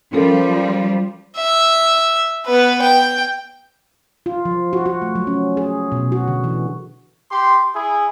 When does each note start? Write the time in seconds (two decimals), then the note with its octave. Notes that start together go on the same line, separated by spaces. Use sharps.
0.13 F3 G3 C#4 A4 A#4
1.37 E5
2.46 B3 B4
2.82 G5
4.26 F4
4.45 F3
4.73 F#4
4.86 F#4
5.02 A3
5.15 F#3
5.27 C#4
5.57 G#4
5.92 B2
6.12 F#4
6.28 D3
6.44 E3
7.30 G4 C6
7.74 E4 G#4